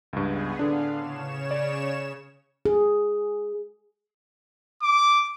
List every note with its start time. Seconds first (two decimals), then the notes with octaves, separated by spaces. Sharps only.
0.13 C#2 G2 B3 G#4
0.59 A2 D3 D4 F5
0.94 C#3 C#5 E7
1.51 D5
2.66 G#4
4.82 D6